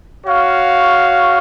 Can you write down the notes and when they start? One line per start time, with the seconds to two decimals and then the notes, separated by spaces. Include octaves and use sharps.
0.25 F#4 C#5 F5